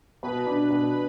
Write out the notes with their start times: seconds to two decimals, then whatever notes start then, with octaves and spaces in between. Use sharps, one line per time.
0.23 B2 B4 B5
0.46 D4
0.71 B2